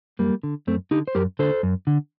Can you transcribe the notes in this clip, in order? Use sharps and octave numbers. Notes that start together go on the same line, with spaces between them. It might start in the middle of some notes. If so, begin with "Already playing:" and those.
F#2 G3 A#3
D3
F#2 A3 C4
D3 D#4 G4
C5
F#2 G4 A#4
D3 A4 C5
F#2
D3